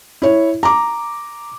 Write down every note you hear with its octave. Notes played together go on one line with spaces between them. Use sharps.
E4 C#5
A#5 D6